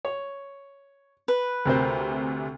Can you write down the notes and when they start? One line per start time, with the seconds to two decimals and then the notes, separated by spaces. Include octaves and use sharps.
0.05 C#5
1.28 B4
1.65 D2 C3 C4 A#4 C5